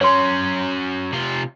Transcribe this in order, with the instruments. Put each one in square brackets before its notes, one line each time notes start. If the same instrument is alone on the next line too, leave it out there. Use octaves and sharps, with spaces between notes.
[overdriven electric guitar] F#3 C#4 [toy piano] C#5 C6
[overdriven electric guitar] C3 F4